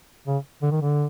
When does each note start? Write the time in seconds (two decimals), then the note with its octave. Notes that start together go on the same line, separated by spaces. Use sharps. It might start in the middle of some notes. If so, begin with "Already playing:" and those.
0.27 C#3
0.62 D3
0.71 D#3
0.81 D3